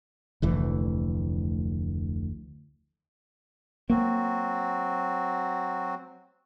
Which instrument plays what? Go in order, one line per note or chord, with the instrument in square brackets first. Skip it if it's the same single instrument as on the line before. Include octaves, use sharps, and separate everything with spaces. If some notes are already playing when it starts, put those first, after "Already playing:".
[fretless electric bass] F1 D2 E3
[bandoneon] F#3 C4 F#4 [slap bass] A#3